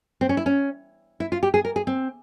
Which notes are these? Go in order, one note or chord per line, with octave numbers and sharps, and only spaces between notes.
C4
C#4
E4
C#4
E4
F4
G4
G#4
A#4
G#4
C4